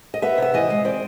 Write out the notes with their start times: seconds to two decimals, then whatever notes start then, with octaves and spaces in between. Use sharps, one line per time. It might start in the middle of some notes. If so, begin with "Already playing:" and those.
0.14 D#5
0.22 B3 E5
0.38 C3 E5
0.54 E3 D#5
0.70 G#3
0.85 C4 D5